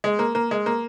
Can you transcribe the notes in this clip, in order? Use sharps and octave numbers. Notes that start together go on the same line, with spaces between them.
G#3
A#3
A#3
G#3
A#3